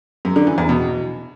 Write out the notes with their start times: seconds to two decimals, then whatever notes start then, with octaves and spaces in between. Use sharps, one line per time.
0.25 F#2
0.36 D3
0.47 E3
0.58 E2
0.69 B2